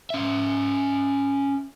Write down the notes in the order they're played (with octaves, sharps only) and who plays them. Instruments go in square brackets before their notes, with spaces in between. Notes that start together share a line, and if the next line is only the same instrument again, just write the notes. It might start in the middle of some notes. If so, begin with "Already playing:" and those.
[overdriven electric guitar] C#4 E5